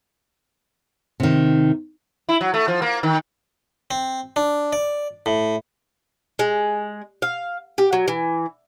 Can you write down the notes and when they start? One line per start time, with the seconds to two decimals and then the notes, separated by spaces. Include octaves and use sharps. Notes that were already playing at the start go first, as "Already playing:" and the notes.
1.20 C3 D#3
2.29 E4
2.41 F#3
2.54 A3
2.68 F3
2.82 A#3
3.03 D#3
3.91 C4
4.36 D4
4.73 D5
5.26 A2
6.39 G#3
7.22 F5
7.78 G4
7.93 F#3
8.08 E3